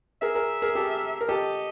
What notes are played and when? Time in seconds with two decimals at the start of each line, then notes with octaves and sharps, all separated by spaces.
0.22 G#4 A#4 E5
0.35 G#4 A#4
0.62 G#4 A#4
0.75 G4 A4
1.21 A#4
1.29 G4 A4 D#5